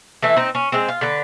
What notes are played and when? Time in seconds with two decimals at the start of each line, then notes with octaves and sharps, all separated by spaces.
0.22 E3 A3 E4
0.36 C4 D#4
0.55 C#4
0.72 G#3 C4
0.88 F4
1.01 D3 B4